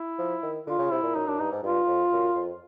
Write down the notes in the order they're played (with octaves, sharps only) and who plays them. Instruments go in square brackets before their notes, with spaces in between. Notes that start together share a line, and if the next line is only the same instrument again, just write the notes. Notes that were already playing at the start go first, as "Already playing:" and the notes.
Already playing: [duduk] E4
[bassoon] F3
D#3
[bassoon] D3 [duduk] F4
[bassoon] C#3
[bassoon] C3 [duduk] E4
[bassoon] A#2
[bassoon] F#2 [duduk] D#4
[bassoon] F#2 [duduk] D4
[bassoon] G2 [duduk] D#4
[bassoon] G#2
[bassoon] G2 [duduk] F4
[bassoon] F2
F#2
F2